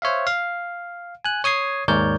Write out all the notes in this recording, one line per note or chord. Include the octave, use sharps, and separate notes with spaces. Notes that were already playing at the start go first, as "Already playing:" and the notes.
C5 C#5 E5 F5
F5
G#5 F#6
C#5 D#6 G#6 C7
D#2 G#2 A#4 C#5 D5 G6